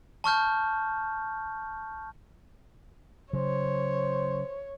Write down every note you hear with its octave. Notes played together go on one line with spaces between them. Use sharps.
A5 C#6 F6 G6
C#3 F#3 C5 C#5